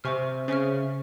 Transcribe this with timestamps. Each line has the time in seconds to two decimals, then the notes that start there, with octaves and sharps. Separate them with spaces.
0.04 C3 C5 E5 G#5 C#6 F6
0.48 C#3 C5 E5 G#5 C#6 F6